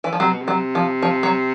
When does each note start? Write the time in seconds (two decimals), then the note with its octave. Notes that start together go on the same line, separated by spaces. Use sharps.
0.04 E3
0.13 F3
0.20 C3 F#3
0.31 B2
0.42 C3
0.48 F#3
0.75 F3
1.03 F3
1.23 F#3